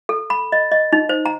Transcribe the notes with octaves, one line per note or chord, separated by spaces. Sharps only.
A4
B5
D#5
D#5
D#4
C5
A#5